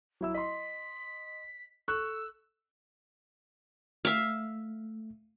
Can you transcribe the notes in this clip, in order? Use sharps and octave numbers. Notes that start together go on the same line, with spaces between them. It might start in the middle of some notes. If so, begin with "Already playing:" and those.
F#3 E4 E6
D#5 C6 B6
A4 C#6 E6 F#6
A3 E5 F5